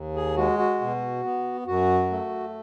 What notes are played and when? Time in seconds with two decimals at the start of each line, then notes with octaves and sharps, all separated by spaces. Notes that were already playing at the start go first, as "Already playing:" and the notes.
Already playing: D#2
0.16 G#4
0.37 G#3 F#4
0.59 F#4
0.81 B2
1.24 B3
1.67 F#2 F#4
2.10 A3